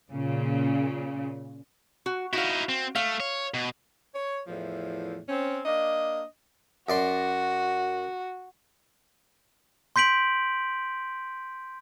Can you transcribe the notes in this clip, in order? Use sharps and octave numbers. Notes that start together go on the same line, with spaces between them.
A#2 C#3
F#4
D#4 E4 F#4 F5
C4
A3 F5
C#5
B2
C#5
E2 A2 E3 F3
C4 C#4
A#3 D4 D#5
F#2 F#4 D5 C6
C6 G6 B6 D7 F#7